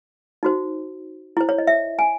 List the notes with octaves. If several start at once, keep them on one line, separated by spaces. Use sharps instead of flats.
D#4 F#4 C5
E4 C5
C#5
D#5
E5
G#5